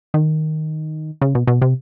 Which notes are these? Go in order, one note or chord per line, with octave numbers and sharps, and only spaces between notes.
D#3
C#3
B2
B2
C3